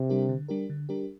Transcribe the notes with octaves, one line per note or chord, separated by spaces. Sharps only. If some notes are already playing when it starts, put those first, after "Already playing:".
Already playing: C3
G3 D4 G4 A#4
D3
G3 D4 G4 A#4
D3
G3 D4 G4 A#4